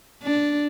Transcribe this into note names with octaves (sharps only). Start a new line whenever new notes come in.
D4